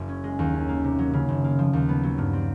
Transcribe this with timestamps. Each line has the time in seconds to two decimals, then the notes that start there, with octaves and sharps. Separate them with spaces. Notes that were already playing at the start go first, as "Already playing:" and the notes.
Already playing: F#1 F#3
0.09 C#4
0.24 G#3
0.39 D#2
0.54 C#4
0.69 A#3
0.84 C3
0.99 F#3
1.13 C#3
1.28 F#1
1.44 A#3
1.59 F3
1.73 D#2
1.89 B3
2.03 F#3
2.18 G2
2.33 C4